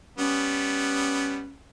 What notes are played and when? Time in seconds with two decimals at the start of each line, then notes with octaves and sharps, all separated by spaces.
0.18 G3 B3 C#4